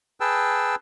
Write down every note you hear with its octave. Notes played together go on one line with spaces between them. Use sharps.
G#4 B4 G5 A5 E6